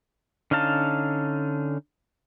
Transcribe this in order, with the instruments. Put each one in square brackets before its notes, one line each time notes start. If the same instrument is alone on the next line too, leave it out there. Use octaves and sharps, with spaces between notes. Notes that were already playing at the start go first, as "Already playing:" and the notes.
[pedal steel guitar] D3 C#4 D#4 F5 A5